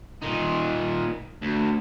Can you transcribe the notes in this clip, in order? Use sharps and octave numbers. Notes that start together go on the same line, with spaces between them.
A#2 D#4
D2